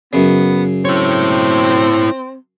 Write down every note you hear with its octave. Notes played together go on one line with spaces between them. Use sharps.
F#2 C#3 B3
C4 E4 C#5